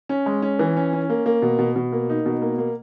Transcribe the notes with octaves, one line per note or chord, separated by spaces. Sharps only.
C#4
G#3
C#4
E3
C#4
C#4
A#3
A#3
B2
B2
B2
A#3
D#4
B2
A#3
A#3